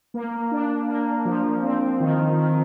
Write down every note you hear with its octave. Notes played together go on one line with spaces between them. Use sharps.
A#3
D4
A#3
F3
C4
D#3
D#3